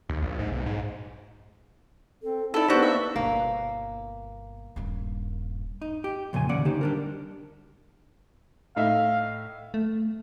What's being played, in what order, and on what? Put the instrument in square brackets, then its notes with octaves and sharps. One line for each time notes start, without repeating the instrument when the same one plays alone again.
[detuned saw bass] D#2
A#1
G#2
B1
G#2
[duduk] C4 [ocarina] A4
[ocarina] D#4 [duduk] E4 [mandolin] A4 D5
[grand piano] B3 D4 [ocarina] D#4 [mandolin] F#4 G4 [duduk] C5
[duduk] A#3 [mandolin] E5
[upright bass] G1 B2 [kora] A#3
[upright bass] D#1 G2
[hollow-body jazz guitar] D#4
G4
F2 A#2 C#3 G#4 G#5
D#2 C#3 C#4 D5 F#5
D3 D#4 G4 C5
G3 D4 A#4
[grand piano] A2 D#4 E5 [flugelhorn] F5
[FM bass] A3